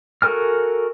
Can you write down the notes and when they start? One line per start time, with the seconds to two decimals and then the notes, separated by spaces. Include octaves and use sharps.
0.22 F#4 A4 A#4 G#5 F6